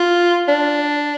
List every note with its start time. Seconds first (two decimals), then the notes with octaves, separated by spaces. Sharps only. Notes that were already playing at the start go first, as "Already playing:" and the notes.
Already playing: F4
0.48 D4